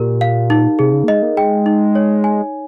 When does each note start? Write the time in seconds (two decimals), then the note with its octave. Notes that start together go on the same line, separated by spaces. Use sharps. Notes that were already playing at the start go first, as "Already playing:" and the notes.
Already playing: A#2 G4 A#4
0.21 F5
0.50 D#4
0.79 C3 G#4
0.93 C#3
1.04 A#3
1.08 G#3 D#5
1.22 A#3
1.37 G#3 G5
1.66 D#4
1.95 C#5
2.24 G#5